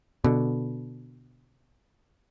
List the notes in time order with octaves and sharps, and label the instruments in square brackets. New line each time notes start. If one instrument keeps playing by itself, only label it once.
[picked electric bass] B2 D3